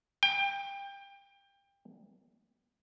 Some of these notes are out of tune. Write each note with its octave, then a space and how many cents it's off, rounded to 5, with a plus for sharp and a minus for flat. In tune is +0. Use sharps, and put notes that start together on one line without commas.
G5 +25